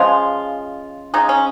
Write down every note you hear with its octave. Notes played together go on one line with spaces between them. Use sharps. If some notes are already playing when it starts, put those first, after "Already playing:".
Already playing: C#3 F3 G#3 F4
C#3 G#3 D#4
C#4